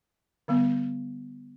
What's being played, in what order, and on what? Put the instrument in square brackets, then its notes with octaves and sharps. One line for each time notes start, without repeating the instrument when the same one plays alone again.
[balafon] D3 G3 B3